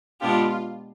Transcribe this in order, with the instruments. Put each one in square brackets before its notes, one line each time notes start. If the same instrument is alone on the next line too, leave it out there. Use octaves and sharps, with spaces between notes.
[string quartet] B2 G#3 B3 D4 G4 [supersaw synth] F4